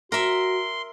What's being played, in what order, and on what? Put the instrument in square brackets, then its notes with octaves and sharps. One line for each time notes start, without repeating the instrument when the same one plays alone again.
[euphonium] F#4 [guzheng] A#4 E5 [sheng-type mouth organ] C6